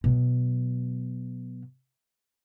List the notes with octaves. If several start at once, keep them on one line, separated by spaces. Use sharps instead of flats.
B2 F#3